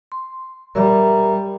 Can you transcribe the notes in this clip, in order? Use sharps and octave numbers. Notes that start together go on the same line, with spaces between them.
C6
G3 A#4 E5 A#5